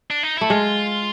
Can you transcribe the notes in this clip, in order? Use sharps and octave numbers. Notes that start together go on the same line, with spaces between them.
D4
D#4
A3 E4
G#3 F4